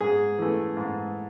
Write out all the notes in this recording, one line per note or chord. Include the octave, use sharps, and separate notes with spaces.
G#2 G#4
E3 A3
G#2